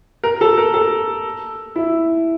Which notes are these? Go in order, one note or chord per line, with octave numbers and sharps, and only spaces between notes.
A#4
A4
A#4
A4
E4